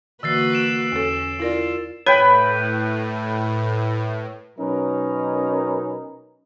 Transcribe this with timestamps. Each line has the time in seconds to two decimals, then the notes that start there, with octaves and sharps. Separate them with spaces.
0.23 D3 E3 A#3 F#4 B4 E6 A6 C7
0.54 D7 E7
0.92 E2 C#4 A4
1.40 E4 F4 A#4 D5
2.06 A2 B4 C#5 G5
4.58 B2 F#3 C#4 D#4 A#4 B4